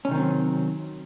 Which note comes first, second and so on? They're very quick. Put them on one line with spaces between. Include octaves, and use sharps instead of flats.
C#4 C3 D#3 C4 F#3